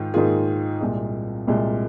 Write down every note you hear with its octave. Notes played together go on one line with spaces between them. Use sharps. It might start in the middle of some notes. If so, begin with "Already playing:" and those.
Already playing: G#2 D#3 F4
G#2 D#3 A#3 F4 G#4
C2 A#2 G#3
C2 A#2 G#3